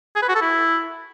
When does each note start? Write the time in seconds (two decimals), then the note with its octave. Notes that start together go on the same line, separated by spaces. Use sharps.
0.16 G#4
0.22 B4
0.29 F#4
0.35 A4
0.41 E4